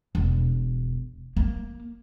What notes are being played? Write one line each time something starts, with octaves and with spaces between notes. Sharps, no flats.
E1
A#3